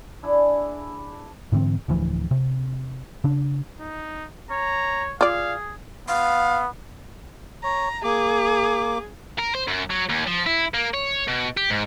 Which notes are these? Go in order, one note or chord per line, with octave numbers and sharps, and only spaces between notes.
D4 E4 G#4 D5
G#2 D3 E3 C4
D1 D2 E3 F3
C3
C#3 D4
D#4
C#5 A#5
F4 G#4 D5 F5
B3 F5
C#5 A#5
A#3 G#4 D6
A#4
C5
F#2
F#3
D#2
F3
E4
A#3
C#5
B2
G4
G#2